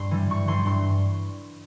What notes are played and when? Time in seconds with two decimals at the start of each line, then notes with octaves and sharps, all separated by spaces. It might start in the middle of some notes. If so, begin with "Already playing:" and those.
Already playing: G2 C6
0.11 E3 G3
0.30 G2 C#6
0.48 E3 G3 C6
0.66 G2 C6